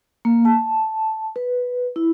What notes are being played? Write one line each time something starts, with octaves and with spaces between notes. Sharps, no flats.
A#3
A5
B4
E4